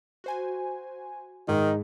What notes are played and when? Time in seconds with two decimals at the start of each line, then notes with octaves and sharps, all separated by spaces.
0.24 F#4 C5 G#5
1.48 G#2 D#3 D#4 G#4